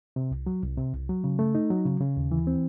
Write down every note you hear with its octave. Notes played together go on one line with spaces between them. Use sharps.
C3
C2
F#3
C2
C3
C2
F#3
C#3
A3
D#4
F#3
C#3
C#3
D#2
E3
C4